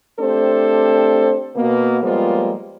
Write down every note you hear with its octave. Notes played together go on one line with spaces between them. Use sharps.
A3 C4 D4 G4 A4 C5
B2 A#3 B3
F3 G3 G#3 A#3 B3 F4